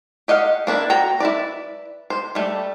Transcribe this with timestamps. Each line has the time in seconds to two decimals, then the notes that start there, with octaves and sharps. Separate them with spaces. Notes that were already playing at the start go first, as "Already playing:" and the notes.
0.28 G4 D#5 F5 F#5
0.67 A#3 D4 E4 B4
0.90 F#4 G5 A#5
1.20 E4 B4 D5
2.10 C5
2.35 G3 A3